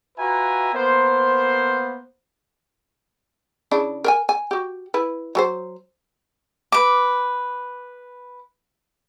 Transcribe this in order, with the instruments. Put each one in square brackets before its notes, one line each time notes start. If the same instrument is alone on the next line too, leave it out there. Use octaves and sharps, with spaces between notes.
[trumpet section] F4 F#4 B4 E5 G#5 A#5
A#3 B3 A#4 C5
[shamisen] C#3 D4 E4
A#4 E5 G#5
G#5
F#4 G4
E4 B4
F#3 A4 C5
[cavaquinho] B4 D6